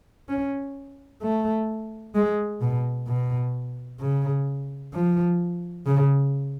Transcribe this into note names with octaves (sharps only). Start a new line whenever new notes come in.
C#4
A3
G#3
B2
B2
C#3
F3
C#3